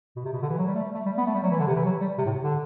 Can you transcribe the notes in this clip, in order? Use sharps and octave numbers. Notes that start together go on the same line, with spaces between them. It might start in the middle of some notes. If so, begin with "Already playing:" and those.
B2
C3
B2
D3
E3
F#3
G3
A3
G3
A3
G3
B3
A3
G3
F#3
E3
D3
C3
E3
F#3
G3
C3
A2
D3